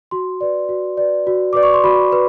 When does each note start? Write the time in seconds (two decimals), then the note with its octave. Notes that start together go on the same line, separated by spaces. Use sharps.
0.11 F#4 C6
0.41 B4 D5
0.69 F#4
0.97 B4 D5
1.27 F#4
1.53 B4 D5 D6
1.63 C#6
1.74 C6
1.84 F#4 B5
2.12 B4